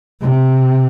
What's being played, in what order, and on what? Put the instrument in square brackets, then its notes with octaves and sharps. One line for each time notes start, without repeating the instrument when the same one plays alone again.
[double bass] C3